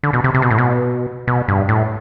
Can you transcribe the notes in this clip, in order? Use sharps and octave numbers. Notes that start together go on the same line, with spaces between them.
D3
B2
C3
C3
B2
A2
B2
B2
G2
A2